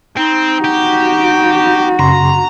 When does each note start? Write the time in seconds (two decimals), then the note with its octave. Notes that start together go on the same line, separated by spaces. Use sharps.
0.17 C4 D#4
0.64 F#4 G4
1.99 F#2 C#3 A#5 C6